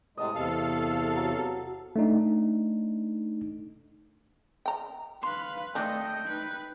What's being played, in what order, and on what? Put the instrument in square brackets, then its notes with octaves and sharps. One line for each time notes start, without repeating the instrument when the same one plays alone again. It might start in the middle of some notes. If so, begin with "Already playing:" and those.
[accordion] A2 C3 G#3 [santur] D#5 A5
[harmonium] E2 C3 [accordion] A4 F5
[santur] F#3
[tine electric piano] A3 D4 D#4
[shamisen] G5 A#5
[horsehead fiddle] B4 F5 [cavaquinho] C6
[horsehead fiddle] A3 D#5 [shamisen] C4 D4 [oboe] G5
[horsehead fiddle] D#4 B4